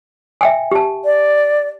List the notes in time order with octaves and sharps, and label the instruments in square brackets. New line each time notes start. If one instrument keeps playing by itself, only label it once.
[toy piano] E5 G5 G#5
G4 A5
[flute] D5